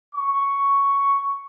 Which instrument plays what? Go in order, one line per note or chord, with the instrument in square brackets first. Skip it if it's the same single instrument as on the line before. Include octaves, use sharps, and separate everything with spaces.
[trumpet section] C#6